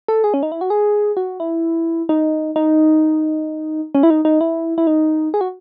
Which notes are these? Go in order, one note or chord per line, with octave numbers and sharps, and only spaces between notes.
A4
G#4
C#4
D#4
E4
F#4
G#4
F#4
E4
D#4
D#4
C#4
E4
D#4
D#4
E4
E4
D#4
G#4
F#4